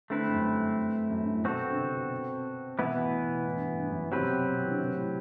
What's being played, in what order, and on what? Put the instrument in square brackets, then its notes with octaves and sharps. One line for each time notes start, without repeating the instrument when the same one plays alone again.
[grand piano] D3 [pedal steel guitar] A3 C4 E4 B4
[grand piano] G2
F#2
G2
F#2
G2
A2
[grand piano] B2 [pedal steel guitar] C4 F#4 A4
[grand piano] B2
D3
C3
B2
[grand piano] B2 [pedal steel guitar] E3 B3 E4
[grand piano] B2
A2
B2
B2
B2
A2
G2
A2
G2
F#2
[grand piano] B2 [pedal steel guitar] F#3 C4 G4 B4
[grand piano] C3
B2
C3
E3
D3
C3
A2